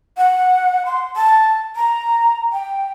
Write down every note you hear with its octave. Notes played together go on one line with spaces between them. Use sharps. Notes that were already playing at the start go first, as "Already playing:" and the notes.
F#5
C6
A5
A#5
G5